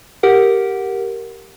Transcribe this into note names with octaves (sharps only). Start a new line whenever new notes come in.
G4 A#4 F#5